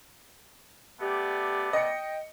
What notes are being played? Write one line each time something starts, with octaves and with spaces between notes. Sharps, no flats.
A3 B3 G4 D5
D#5 G5 C#7